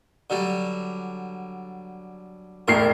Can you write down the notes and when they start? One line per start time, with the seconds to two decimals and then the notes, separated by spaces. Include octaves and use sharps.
0.30 D3 F#3 G3
2.68 E1 A2 A#4 C7